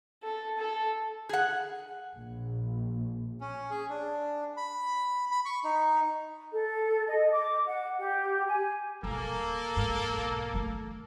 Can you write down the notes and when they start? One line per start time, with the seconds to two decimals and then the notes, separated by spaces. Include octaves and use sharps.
0.23 A4
0.58 A4
1.29 G#4 F#5
2.15 A#1
3.41 C#4
3.70 G#4
3.90 D4
4.57 B5
5.31 B5
5.45 C#6
5.64 D#4
6.52 A4
7.08 D#5
7.31 D6
7.66 F#5
7.98 G4
8.47 G#5
9.03 D#1 G#1 A#3 A4
9.76 G#2
10.17 B1
10.53 D#3 A3